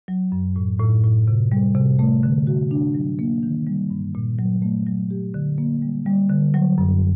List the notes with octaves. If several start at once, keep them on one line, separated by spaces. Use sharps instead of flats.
F#3
F#2
A2
A2
A2
C3
G3
C3
A3
D3
F#4
D4
F#3
A#3
D#3
G3
G2
A#2
F#3
A3
F#3
G4
D3
A#3
G3
G3
D3
F#3
F#2